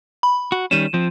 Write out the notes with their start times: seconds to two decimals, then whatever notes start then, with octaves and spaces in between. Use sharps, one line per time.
0.23 B5
0.52 F#4
0.71 D#3 G3 C#4 D#7 E7
0.94 F3 C4